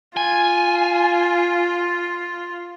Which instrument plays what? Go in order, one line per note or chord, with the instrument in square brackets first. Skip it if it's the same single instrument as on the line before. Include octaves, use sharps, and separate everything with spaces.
[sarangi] F4 [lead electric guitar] G#5